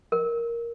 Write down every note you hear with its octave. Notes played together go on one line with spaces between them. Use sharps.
A#4